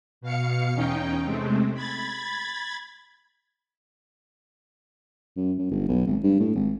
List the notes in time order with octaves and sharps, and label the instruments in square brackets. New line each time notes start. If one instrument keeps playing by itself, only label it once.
[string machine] B2 F5 C#7
E2 C#4 D#4 G5
C3 G#3 A3 C4
B5 G#6 A6
[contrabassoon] F#2
F#2
G1
B1
G#1
G2
A2
G#1